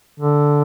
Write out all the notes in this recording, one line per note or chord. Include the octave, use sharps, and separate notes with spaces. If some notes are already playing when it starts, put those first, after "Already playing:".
D3